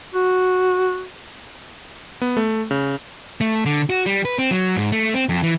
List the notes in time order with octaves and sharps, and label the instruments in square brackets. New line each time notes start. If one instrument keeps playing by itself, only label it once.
[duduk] F#4
[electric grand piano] B3
A3
C#3
[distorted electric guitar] A3
D3
F#4
G3
B4
C4
F#3
G#2
A3
C4
F2
E3